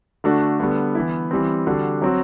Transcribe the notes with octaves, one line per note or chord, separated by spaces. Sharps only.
D3 A3 D4 F#4
D3 G3 B3
E3 B3 E4
E3 G3 C4
D3 G3 D4 F#4
F#3 C4 F#4